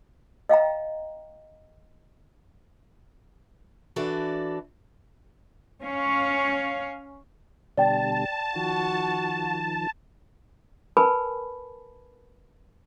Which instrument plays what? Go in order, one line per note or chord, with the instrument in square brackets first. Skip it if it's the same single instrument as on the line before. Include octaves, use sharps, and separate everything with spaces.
[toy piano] D#5 F5 G5 A#5
[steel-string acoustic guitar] E3 D4 F#4 A4 D5
[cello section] C#4 C#5 F5
[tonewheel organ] B2 D3 G3 [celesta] D5 G5 [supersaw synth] A5
[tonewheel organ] D#3 F3 [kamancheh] F#4
[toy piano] A#4 B4 G#5 A5 B5